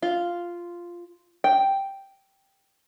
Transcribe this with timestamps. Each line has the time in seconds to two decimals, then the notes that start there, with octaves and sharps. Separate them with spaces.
0.02 F4
1.44 G5